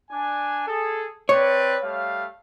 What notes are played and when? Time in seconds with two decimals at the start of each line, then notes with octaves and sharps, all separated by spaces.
0.11 D4 G#5
0.67 G#4 A4
1.29 C4 B4 C#5 D5
1.83 G3 A3 F5